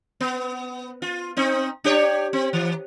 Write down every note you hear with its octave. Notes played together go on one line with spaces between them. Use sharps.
B3
F4
C4 D#4
D4 G4 C#5
C4
E3